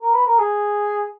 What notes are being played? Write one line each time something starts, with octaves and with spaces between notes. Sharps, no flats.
A#4
B4
A#4
G#4